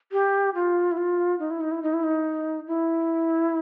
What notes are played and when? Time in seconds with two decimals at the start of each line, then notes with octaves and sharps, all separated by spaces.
0.12 G4
0.55 F4
0.92 E4
0.97 F4
1.39 D#4
1.51 E4
1.61 D#4
1.72 E4
1.83 D#4
1.94 E4
2.03 D#4
2.67 E4